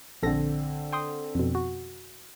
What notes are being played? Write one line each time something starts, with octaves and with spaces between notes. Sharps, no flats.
A#1 D3 C4 A4 A#6
G5 C6 D#6
F2 B2
F#4